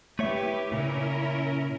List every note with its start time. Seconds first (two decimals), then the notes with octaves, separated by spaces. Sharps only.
0.19 A3 E4 G4 B4 C#5 E5
0.72 A#2 C#3 C#4 E4 A#4